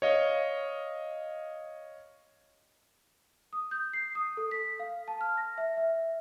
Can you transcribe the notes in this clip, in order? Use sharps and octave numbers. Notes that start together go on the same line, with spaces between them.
C#5 D#5 F5
D#6
G6
C7
D#6
A4
B6
F5
A5
F6
A#6
E5
E5